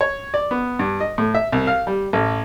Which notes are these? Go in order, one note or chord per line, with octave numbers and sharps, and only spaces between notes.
C#5
D5
B3
G2
D#5
A2
E5
C2
F5
G3
A1